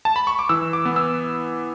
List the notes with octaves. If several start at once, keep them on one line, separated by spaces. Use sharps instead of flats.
A5
B5
C#6
D6
E3 E6
D6
B3
E6